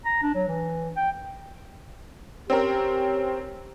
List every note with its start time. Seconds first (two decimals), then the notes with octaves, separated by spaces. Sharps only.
0.05 A#5
0.22 D4
0.35 F#3
0.48 E3
0.96 G5
2.50 C4 C#4 G4 A#4